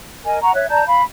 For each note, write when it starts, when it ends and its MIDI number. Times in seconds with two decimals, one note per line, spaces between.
0.25 0.41 70
0.25 0.41 75
0.25 0.41 80
0.42 0.54 78
0.42 0.54 82
0.42 0.54 85
0.54 0.66 73
0.54 0.66 76
0.54 0.66 90
0.69 0.84 74
0.69 0.84 81
0.69 0.84 82
0.69 0.84 91
0.86 1.04 77
0.86 1.04 83